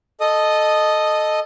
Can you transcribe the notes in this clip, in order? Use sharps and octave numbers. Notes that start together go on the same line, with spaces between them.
A4 D#5 D#6